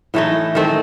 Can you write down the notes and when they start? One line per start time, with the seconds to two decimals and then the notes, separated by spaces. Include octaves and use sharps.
0.14 A2 E3 A3 D#4
0.55 D#3 A3 C4